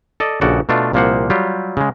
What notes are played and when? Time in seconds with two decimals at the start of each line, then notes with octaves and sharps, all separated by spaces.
0.20 A4 D5 D#5
0.41 A#1 C#3 F#4 A4 D5
0.69 B2 A3 D4 F4
0.93 C2 A#2 F3 A#3 C5 F#5
1.30 F#3 G3 F4 G4
1.77 C#3 G#3